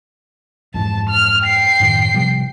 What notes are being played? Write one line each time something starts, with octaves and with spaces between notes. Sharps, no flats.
F2 G#2 E3 A5
F6
G5 C7
F#2 A2 D#3
C3 F3 G3